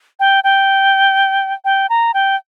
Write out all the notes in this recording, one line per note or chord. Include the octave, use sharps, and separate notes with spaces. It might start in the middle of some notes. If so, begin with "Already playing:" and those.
G5
G5
G5
A#5
G5